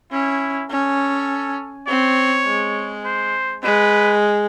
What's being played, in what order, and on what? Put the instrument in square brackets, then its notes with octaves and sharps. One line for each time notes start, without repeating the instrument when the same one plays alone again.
[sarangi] C#4 [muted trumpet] E4
[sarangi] C#4 [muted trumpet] A4
[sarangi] C4 [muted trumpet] C#5
[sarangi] G#3
[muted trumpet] C5
[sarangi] G#3 [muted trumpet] B4